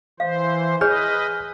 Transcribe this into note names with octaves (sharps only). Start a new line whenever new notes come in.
E3 C5 F5
G#4 B4 C#5 D#5 G#5 F6 G6